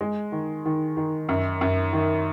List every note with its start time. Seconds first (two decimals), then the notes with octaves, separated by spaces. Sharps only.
0.01 G#3
0.32 D#3
0.65 D#3
0.97 D#3
1.29 F#2
1.61 F#2
1.93 D#3